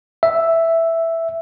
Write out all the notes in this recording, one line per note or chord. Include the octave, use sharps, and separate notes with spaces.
E5